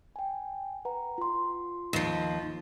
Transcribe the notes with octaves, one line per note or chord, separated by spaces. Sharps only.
G5 G#5
B4 F#5 A#5
F4 C6
D#2 F3